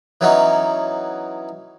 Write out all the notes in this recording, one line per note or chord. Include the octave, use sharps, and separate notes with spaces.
E3 F#3 B3 C#4 D#4